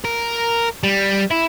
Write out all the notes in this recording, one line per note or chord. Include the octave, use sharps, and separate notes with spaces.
A#4
G3
E4